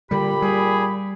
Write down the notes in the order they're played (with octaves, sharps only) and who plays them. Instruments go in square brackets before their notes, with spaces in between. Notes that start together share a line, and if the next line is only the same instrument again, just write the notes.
[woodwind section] A#2 B5 [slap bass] D3 G3 [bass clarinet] G4
[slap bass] G3 [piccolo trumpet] G#4